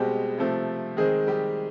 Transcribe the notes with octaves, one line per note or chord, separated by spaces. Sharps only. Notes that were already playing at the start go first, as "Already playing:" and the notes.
Already playing: B2 G3 G#3 C4 G4
C3 F3 A3
D#3 G#3 C4 G#4
G3 G4